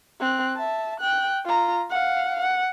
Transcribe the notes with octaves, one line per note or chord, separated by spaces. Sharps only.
C4 F#6
E5 A5
G5 F#6
F4 A#5
F5 F#5
F#5